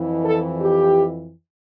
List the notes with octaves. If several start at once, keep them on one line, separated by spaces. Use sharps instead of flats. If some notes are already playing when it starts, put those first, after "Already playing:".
Already playing: F2 E3
A4
G4